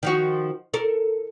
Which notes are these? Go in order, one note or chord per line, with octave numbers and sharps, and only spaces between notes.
D#3 F3 F#4
A4 A#4